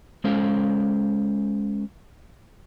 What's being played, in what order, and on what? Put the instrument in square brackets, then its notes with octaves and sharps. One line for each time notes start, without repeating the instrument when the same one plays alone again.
[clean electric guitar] G#3 C#4 A4 C5 C#5 F5